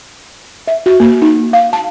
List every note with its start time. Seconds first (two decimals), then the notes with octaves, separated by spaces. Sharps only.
0.68 E5
0.86 F#4
1.00 A#3
1.22 D#4
1.53 F5
1.73 A5